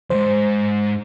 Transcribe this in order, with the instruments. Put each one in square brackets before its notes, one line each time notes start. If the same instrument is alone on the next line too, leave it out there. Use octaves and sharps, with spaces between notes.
[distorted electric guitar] E2 G#2 [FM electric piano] C5